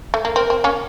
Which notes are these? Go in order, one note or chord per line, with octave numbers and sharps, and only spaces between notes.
A3
A#3
C4 A#4
C4
A#3 C#4